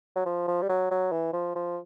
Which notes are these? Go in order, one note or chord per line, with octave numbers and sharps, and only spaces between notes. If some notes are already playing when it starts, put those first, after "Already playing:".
F#3
F3
F3
G3
F#3
F#3
E3
F3
F3